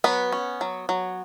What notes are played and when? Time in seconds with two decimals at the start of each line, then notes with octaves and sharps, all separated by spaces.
0.04 F#3 B3 B4
0.32 C#4
0.61 F#3
0.89 F#3